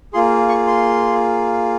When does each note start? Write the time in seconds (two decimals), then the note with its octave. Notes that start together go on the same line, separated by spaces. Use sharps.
0.13 A#3 F4 G#4 C6
0.49 C#6
0.67 C6